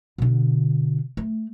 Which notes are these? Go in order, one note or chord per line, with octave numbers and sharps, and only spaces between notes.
B2 D3
A3